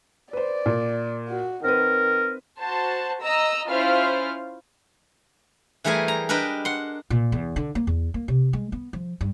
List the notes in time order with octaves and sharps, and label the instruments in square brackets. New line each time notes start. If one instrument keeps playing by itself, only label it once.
[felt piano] B4 C5 [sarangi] D5
[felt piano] A#2
[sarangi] F#4
[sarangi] D#3 [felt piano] C4 B4 [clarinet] A#4
[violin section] F#4 C5 A5
D#5 A#5 E6
C#4 E4 F4 C5 F5 F6
[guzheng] E3 G3 A3 G#4 A#4 G#5
A#5
D4 A#4 B4 D#5 G5
F#5 C6
[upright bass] A#2
E2
D3
A#3
E2
A#3
C3
G#3
B3
F3
G2